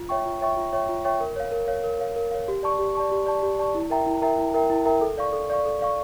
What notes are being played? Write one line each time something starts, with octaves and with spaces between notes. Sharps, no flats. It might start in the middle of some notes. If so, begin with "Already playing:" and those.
Already playing: F4
C#5 E5 G5 C#6
F4
C#5 E5 G5 C#6
F4
C#5 E5 G5 C#6
F4
C#5 E5 G5 C#6
A#4
C#5 F5
A#4
C#5 F5
A#4
C#5 F5
A#4
C#5 F5
G4
D5 A5 C#6
G4
D5 A5 C#6
G4
D5 A5 C#6
G4
D5 A5 C#6
E4
A#4 E5 G5 A#5
E4
A#4 E5 G5 A#5
E4
A#4 E5 G5 A#5
E4
A#4 E5 G5 A#5
A4
D5 F5 C#6
A4
D5 F5 C#6
A4
D5 F5 C#6